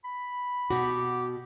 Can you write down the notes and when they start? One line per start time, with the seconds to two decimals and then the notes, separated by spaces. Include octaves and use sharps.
0.04 B5
0.70 B2 F#4 G4